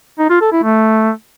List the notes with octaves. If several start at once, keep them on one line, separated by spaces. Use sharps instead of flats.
D#4
F4
A4
E4
A3